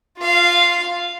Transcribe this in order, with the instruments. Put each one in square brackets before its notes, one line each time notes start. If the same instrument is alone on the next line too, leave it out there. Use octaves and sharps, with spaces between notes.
[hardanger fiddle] F4 F5